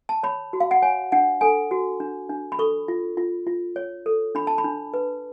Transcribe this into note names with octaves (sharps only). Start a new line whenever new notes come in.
A5
C#5 B5
F#4
F5
F#5
C#5 G#5
D4 F#5
A4 G#5
F#4
D4
D4
B5
A4 C#6
F4
F4
F4
C#5
A4
D4 B5
A5
B5
D4
B4